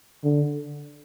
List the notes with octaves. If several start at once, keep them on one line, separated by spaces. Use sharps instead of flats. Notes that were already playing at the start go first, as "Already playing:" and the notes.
D3